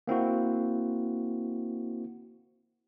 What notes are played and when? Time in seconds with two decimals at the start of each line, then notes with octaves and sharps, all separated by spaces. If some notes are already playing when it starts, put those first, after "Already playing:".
0.07 A#3 C4 E4 F#4